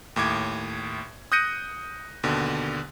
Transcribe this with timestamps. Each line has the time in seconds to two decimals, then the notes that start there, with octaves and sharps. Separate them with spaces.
0.16 D#2 A2 D6 G#6
1.32 D#6 F#6 G6 A#6 C#7 D#7
2.23 D#2 B2 D3